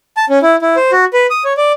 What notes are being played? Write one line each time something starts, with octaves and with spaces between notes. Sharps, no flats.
A5
C#4
E4
E4
C5
F#4
B4
D#6
C#5
D5